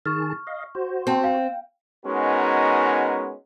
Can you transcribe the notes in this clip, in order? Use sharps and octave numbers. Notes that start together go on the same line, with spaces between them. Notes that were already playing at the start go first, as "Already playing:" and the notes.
D#3 G#4 A5 C#6 F6
D#5 F5
F#4 C5
C4 G5 A5
F5 G5
G#3 B3 C#4 D#4 F#4 A#4